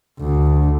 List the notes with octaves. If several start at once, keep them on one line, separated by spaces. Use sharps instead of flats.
D2